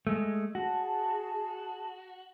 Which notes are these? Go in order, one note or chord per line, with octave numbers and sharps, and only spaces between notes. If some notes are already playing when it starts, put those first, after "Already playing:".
G#3 A3
F#4 G#4 A5